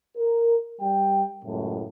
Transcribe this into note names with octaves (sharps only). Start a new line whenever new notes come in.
A#4
G3 G5
C#2 F#2 A2